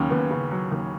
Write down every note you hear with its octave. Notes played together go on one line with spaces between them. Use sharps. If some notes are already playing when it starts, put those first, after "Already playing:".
Already playing: D#2 C#3 F#3 C#4
D#2 B3
C#3
F#3
D#2